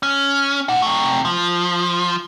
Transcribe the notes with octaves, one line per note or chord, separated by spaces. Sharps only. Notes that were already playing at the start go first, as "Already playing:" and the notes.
C#4
A#3 F#5
C3 A3
F3